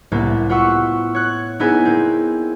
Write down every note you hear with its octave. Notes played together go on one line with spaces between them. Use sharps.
C2 A2 A#3 B3
F4 B4 F#5 C#6 E6
C#5 F#6
B3 D#4 E4 G#4 B4 G#5
A#3 C4